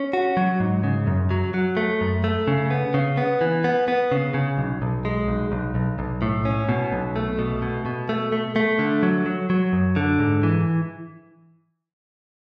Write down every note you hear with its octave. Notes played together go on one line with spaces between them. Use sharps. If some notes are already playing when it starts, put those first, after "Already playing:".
Already playing: C#4
F#4
F#3
G#2
C#3
F#2
F#3
F#3
A3
F#2
A3
C#3
B3
C#3
B3
E3
B3
B3
C#3
C#3
B1
B1
G#3
B1
B1
B1
B1
A2
C#4
B2
B1
A3
B2
B2
B2
A3
A3
A3
D3
F#3
F#3
F#3
F#2
D3
G#2
E3